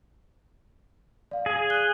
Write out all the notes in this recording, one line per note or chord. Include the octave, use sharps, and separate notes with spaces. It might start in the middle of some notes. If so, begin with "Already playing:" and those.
D5 F5
G#4
F#6 G7